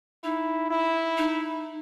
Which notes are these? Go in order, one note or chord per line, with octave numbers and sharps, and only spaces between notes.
D#4 E4
E4
D#4